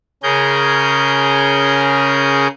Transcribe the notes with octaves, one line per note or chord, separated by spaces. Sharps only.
C#3 C#4 G#4 A#4 G6